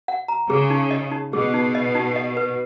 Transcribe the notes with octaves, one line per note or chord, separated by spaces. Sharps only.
F#5
A#5
C#3 G#4
D#4
D#5
D#4
B2 G#4
D#4
D#5
D#4
D#5
B4